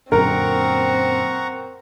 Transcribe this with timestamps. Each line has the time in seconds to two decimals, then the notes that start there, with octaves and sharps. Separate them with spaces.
0.12 F#2 A#2 D3 C4 A#4 F#5 A#5 C#6